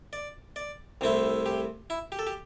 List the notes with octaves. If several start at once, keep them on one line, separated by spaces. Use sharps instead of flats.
D5
D5
C2 C3 A3 C4 E4
G4
E4
G4
A4
G4